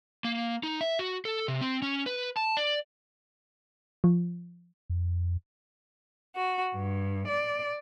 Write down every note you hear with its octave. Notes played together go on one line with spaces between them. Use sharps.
A#3
D#4
E5
F#4
A4
C3
C4
C#4
B4
A5
D5
F3
F2
F#4
G2
D5